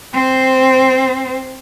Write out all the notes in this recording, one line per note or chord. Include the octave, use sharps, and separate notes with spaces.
C4 C5